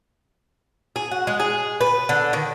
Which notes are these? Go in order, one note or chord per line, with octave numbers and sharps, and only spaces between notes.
G#4
F#4
G#3
G#4
B4
D3
D#3